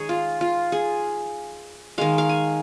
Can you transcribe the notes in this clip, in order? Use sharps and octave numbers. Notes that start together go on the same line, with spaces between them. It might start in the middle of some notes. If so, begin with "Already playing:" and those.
Already playing: D#3 G#3 G#4 C#5
F4
F4
G#4
D#3 G#3 F5
F5
G#5